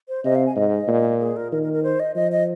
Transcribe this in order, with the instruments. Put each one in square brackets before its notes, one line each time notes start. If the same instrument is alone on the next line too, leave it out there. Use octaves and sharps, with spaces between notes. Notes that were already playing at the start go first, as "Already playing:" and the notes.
[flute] C5
[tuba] C3 [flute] D#5
[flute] F5
G#5
[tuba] G#2 [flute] D#5
[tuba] A#2
[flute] G#4
A#4
[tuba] D#3 [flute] A#4
[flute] A#4
A#4
C5
D#5
[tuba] F3 [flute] D#5
[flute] D#5